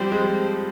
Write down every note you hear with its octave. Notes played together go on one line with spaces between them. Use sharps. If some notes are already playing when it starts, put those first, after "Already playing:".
Already playing: F3 G3 C4 G4 C5
G#3